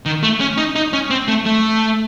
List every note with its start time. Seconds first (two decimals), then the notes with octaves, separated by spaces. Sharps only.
0.06 D#3
0.23 A3
0.40 C#4
0.57 D#4
0.76 D#4
0.93 C#4
1.10 C4
1.28 A3
1.46 A3